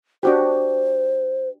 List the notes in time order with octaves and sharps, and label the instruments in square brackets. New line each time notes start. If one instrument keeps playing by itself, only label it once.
[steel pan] D4 F#4 G4 [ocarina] C5